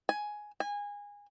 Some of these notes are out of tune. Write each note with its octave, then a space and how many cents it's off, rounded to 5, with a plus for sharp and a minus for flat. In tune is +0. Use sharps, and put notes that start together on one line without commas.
G#5 +5
G#5 -20